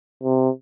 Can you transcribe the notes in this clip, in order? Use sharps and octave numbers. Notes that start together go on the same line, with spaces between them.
C3